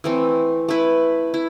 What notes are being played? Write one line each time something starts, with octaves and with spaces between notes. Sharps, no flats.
E3 A3 C4
A3 E4 B4
E4